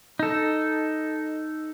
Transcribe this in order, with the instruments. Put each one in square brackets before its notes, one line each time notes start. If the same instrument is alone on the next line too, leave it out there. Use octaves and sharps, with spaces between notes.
[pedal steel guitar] D#4 A4